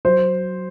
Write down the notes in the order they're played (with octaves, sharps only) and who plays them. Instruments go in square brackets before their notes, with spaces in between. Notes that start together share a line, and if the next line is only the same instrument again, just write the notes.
[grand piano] F#3 C5